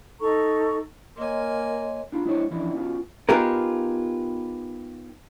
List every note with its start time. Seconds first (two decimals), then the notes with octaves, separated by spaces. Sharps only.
0.21 D#4 A4 A#5 C#6
1.16 A#3 A#4 C#5 D#5 G#5 C6
2.12 D4 F4
2.25 G#3 D4 E4 A4 C5 C#5
2.51 E3 F3 C#4 D4 E4
2.75 B3 C#4 D4 F4 F#4
3.29 B3 D#4 F4 G4 G#4 A#4